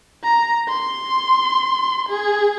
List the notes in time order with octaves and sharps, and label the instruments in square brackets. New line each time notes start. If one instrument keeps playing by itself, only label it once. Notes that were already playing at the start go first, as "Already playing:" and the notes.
[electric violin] A#5
C6
G#4